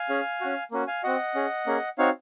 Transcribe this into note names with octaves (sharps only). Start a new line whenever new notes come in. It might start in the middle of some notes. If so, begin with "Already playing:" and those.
Already playing: F5 G#5
C#4 G#4
C#4 F#4
A#3 C#4 F#4
F5 G#5
C4 F#4 D#5 F#5
C#4 G#4
A#3 C#4 G#4
C4 D#4 F#4 C#5 F5